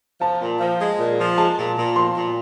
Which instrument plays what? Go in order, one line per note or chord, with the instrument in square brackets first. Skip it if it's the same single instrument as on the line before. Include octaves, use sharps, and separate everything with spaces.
[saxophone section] F3 [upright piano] A5
[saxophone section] A#2
F3
G#3
A#2
F3
[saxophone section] G#3 [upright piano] A5
[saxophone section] A#2
A#2
[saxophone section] F3 [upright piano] C6
[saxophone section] A#2